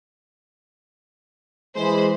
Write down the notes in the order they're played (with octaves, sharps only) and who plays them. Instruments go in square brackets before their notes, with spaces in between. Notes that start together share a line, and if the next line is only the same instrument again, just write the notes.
[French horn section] E3 G#3 [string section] C5 B5